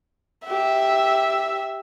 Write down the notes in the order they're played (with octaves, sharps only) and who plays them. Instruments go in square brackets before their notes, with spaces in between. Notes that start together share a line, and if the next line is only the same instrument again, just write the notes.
[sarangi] G4 [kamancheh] E5